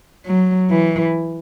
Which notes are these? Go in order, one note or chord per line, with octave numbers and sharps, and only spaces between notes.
F#3
E3